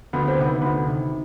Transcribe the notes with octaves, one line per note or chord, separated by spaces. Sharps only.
D2 B3
C4
C3 D#3 B3
D2 B3
C3 D#3